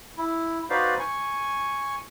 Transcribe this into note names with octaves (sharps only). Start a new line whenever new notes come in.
E4
D#4 F#4 B4 C5 D5 F5
G#5 C#6